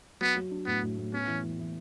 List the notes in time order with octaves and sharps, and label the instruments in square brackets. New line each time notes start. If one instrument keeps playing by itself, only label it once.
[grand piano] F#3 [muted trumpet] B3
[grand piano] F#3
D4
[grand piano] A2 [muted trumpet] B3
[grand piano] A2
A2
[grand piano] B3 [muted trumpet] C#4
[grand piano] E3
E3
E3